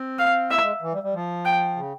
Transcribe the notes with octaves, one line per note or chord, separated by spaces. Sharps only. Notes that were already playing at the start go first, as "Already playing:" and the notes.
Already playing: C4
F5
E4 E5
G#3
E3
G3
G3
F3
G5
C#3